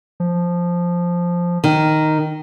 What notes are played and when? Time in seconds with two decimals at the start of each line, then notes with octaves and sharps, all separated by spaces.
0.20 F3
1.64 D#3